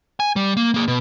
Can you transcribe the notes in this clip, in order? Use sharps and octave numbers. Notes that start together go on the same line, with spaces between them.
G#5
G3
A#3
A#3 G#4
B2